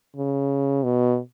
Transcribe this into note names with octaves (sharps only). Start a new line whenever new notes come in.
C#3
B2